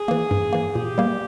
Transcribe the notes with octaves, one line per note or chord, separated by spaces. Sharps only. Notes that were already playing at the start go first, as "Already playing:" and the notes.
Already playing: G#4
E3 A#3
G2
E3 A#3
A#2 G4
G3 A#3